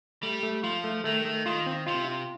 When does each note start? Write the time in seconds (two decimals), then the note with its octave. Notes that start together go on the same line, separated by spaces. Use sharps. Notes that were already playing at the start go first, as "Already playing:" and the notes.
0.23 G3 A3
0.43 A3
0.63 F3 F4
0.84 A3
1.04 D#3 A3
1.25 A3
1.46 D#3 F4
1.66 C4
1.86 C3 F4
2.08 F4